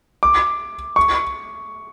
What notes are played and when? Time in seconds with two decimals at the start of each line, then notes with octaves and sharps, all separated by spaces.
0.23 D6
0.96 C#6